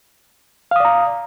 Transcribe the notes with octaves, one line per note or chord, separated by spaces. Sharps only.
D5 F5 A#5 D#6